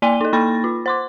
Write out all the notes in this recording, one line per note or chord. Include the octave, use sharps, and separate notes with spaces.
A#3 D5 G#5 C6 D#7 G7
D#4 A4
A#3 D#4 B5 C#6 A6 A#6
F4
C5 C6 D6